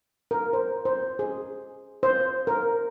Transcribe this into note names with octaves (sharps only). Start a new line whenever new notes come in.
A#4
C5
C5
G#4
C5
A#4